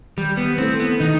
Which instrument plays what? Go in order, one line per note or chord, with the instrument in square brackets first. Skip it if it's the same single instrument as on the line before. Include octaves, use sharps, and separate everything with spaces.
[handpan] D#3 [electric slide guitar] G3
[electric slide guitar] B3
[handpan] A3 E4 A4 [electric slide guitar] C4
[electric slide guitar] B3
[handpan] D#3 [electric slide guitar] D#4